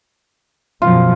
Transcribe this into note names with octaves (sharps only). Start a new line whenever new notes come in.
F#2 B2 F3 F4